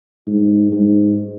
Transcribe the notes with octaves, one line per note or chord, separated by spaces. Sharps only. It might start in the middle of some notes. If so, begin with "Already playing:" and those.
G#2
G#2